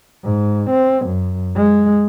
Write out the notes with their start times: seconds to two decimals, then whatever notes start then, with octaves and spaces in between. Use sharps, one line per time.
0.24 G#2
0.69 C4
1.06 F#2
1.55 G#3